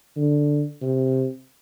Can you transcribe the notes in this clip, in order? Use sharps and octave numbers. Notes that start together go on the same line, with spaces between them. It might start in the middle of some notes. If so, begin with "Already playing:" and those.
D3
C3